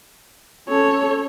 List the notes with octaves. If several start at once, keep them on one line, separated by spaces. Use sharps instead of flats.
C#4 A4 C#5